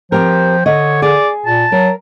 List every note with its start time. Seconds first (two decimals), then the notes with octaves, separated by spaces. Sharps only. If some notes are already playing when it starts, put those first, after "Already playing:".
0.12 F3 C4 G4 A#4 G5
0.66 D3 C#5 D#5
1.02 G#4 D5
1.46 A#2 A5
1.72 F#3 A#4